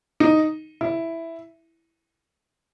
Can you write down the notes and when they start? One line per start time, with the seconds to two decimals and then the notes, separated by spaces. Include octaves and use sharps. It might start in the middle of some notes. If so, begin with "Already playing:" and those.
0.20 D#4
0.81 E4